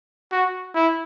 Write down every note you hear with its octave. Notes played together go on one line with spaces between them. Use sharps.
F#4
E4